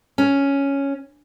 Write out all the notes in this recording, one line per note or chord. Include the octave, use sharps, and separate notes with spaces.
C#4